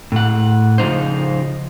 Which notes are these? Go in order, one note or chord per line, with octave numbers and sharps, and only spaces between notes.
A2 F#5
C#3 F3 D#4 C5